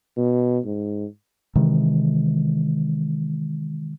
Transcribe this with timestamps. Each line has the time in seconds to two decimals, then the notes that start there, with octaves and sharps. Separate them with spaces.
0.17 B2
0.65 G#2
1.55 C3 D#3 E3 G#3